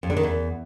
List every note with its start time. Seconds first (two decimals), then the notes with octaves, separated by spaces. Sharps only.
0.03 F2
0.10 D3
0.17 D#3
0.23 E2